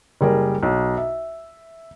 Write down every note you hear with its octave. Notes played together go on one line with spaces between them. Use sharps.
F#1 G3 G#4 A#4
B1
E5